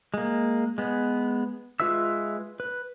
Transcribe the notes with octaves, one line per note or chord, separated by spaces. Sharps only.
G#3 A#3
G#3 B3
G#3 F4 B4 E5 E6
B4